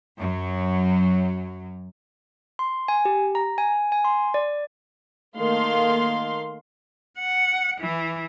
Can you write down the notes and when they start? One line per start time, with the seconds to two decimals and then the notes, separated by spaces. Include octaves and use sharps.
0.18 F#2 F#3
2.59 C6
2.88 G#5
3.05 G4
3.35 A#5
3.58 G#5
3.92 G#5
4.05 C6
4.34 D5
5.37 D#3 A3 A#3 F5 C6
7.19 F#5
7.81 E3